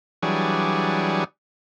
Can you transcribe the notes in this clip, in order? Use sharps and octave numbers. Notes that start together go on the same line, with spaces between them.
E3 F#3 G3 D4 G#4 C#6